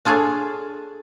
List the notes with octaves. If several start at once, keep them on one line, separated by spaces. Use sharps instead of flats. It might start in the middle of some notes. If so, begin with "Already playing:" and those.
D4 F4 G#4 A4 C#5